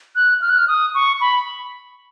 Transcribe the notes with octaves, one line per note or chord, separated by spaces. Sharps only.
F#6
F6
F#6
F6
D#6
C#6
B5